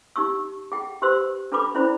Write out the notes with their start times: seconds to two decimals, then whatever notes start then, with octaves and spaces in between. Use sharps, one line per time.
0.16 D#4 G4 C#6 E6
0.72 G#4 G5
1.02 G4 B4 C5 C6 E6
1.52 D4 A4 B4 B5 D6
1.75 C#4 E4 C5 D5 B5